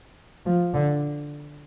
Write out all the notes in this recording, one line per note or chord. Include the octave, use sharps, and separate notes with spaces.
F3
D3